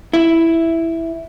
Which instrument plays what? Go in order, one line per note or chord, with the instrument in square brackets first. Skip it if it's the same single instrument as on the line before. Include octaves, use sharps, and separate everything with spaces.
[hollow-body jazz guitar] E4